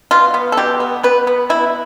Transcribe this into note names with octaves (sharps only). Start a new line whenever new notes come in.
B2 F4
B3
A4
B2 G4
B3
B3 B4
B3
B2 E4